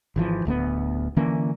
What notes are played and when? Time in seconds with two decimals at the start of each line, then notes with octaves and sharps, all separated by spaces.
0.16 G#1 E3 F3
0.45 D1 D2 A3 B3
1.17 D3 E3 A#3 C#4